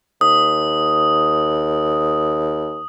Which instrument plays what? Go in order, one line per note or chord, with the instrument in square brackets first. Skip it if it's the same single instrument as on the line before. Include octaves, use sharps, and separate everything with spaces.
[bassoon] D#2 [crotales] D#6